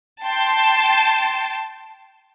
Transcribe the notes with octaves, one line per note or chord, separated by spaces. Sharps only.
G5 A5 C6